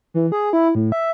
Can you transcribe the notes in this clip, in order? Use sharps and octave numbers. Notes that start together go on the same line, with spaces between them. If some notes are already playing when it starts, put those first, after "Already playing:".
E3
G#4
E4
A2
E5